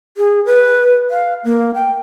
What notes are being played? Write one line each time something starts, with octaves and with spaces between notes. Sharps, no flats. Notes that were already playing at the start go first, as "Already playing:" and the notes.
G#4
B4
F5
A#3
G5